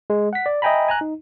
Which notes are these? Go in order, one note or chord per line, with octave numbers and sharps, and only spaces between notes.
G#3
F#5 B6
D5
D#5 E5 G5 G#5 A#5 B5
G#5 A#5 F#6
D#4